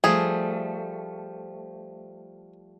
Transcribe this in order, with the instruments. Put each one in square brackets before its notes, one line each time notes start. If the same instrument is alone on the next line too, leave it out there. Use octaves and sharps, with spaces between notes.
[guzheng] F3 G3 A3 [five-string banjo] G#4